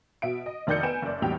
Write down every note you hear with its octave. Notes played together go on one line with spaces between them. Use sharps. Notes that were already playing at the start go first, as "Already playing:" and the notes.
B2 E5 D7
D#5
F1 D#3 D5 D#5 G6 C#7
B3 G#5 D7 E7
F#1 D5
B1 E2 A2 G3 G5 F7